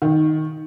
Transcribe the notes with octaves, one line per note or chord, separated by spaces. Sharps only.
D#3